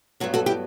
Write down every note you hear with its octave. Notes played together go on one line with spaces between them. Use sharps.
G2 F#3 B3 F#4 A4
F#4 A4
E4 G4